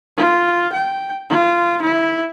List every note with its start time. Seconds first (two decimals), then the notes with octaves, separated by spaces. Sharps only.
0.17 F4
0.73 G5
1.30 F4
1.82 E4